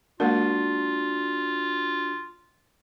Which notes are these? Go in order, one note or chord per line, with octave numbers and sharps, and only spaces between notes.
G#3 A#3 D4 F4 F#4 A#4